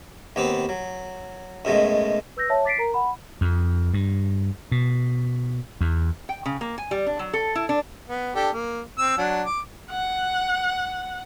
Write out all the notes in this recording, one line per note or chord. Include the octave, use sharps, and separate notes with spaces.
D#2 B3 C4 B4
F#3
F#2 B2 G#3 A3
B4 E6 G6 A#6
C#5 E5 A5
D6 A6 B6 C7 D7
A#4 A#5
F#5 B5
F2
G2
B2
E2
G5
C#3
A#3
G#5
G3
D4
F#3
A4
E4
D4
B3
D4 G4 A4
A#3
C4 E6
F#3 D4
D6
F#5